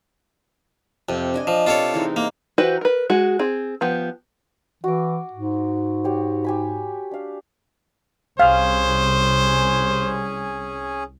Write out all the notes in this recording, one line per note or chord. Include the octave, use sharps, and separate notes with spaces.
F2 C3
D4 D#5 G#5
F3
C3 F4 A4 C#5 D6
E3 G#3 D#4
A#3 A#5
E3 F#4 G4 B4 C5
A#4 B4
G#3 F#4 G#4
C4 G#4
F3 B3 G4
E3 F#4 D6
G#2
F#4 G4 C#5
G4 G#5 B5
D4 F5
C2 C#4 G#4 C5 F5